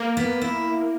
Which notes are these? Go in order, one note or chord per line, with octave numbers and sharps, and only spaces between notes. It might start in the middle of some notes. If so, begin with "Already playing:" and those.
Already playing: A#3
B3
E4